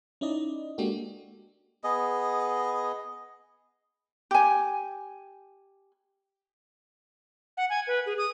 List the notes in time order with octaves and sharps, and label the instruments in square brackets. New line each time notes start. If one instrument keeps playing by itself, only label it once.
[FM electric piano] C#4 D#4 E4 D5 D#5
G#3 A#3 D4 F#4 G4 A4
[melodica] B3 G#4 D#5
[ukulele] G4 G#5
[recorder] F#5
G#5
B4
G#4
D#6